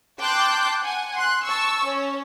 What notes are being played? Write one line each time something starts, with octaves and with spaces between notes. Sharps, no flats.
G5 A5 C6 D6 F#6 G6
F#5 G#5
C6 F#6
A5 C#6 E6
C#4 C#5